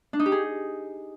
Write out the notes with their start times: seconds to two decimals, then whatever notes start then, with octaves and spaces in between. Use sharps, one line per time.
0.13 D4
0.19 D#4
0.26 G4
0.32 G#4